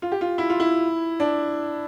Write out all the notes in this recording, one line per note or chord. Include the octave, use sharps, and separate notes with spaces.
F4
G4
F4
E4
F4
E4
D4